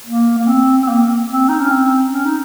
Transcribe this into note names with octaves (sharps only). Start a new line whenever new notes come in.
A#3
A#3
C4
C4
A#3
C4
D#4
C#4
C4
C#4
D#4